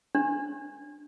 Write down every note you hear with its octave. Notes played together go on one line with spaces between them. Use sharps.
D4